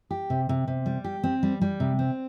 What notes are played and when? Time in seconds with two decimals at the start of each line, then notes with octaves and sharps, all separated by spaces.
0.11 G4
0.30 C3
0.49 C3
0.68 C3
0.86 G3
1.04 G4
1.23 C4
1.43 G3
1.61 G3
1.80 C3
1.99 C4